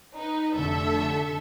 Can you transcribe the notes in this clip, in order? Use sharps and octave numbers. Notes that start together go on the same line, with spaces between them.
D#4 B4
F1 D3 A3 A4 E5